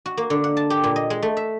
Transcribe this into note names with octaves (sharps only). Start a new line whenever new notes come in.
F#4
A#3
D3
F#5
A5
G4
A#2
D#5
G#3
A3
E5